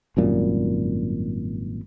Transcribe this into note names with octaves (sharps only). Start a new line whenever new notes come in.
G#1 F#2 A#2 G3